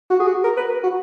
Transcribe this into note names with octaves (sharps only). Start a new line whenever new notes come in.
F#4
G#4
F#4
A#4
B4
F#4